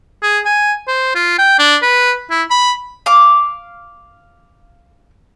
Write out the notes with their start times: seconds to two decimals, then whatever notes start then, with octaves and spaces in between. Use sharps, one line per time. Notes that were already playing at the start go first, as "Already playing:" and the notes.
0.23 G#4
0.45 G#5
0.88 C5
1.15 F4
1.39 G5
1.59 D4
1.82 B4
2.31 E4
2.50 B5
3.06 F5 D6